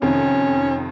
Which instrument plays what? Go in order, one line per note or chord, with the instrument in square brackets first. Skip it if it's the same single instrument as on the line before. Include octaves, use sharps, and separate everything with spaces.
[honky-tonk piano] F2 C3 D#3 [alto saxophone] C#4